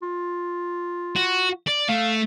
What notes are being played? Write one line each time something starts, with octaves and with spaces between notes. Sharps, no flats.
F4
F#4
D5
A3 F5